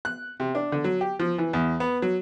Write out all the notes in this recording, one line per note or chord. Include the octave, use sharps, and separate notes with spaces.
F#6
C3
D4
D3
F#3
G4
F3
E3
E2
B3
F#3